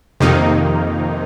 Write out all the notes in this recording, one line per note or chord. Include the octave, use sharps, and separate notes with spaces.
F2 C3 D#3 A#3 D#4